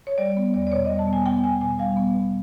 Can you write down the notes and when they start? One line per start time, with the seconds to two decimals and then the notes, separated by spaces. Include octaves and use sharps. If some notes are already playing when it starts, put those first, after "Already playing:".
0.07 C#5
0.18 G3 D5
0.37 B3
0.54 E2 D5
0.67 D5
0.72 B2 C#5
0.85 D#5
0.90 G3
0.99 A5
1.07 B3
1.13 G#5
1.26 B3 G5
1.43 B2 G#5
1.61 B2 G#5
1.79 G3 F5
1.97 B3
2.15 B2